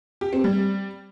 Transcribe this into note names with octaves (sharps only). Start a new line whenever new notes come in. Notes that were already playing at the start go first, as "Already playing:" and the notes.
G4
C4
G3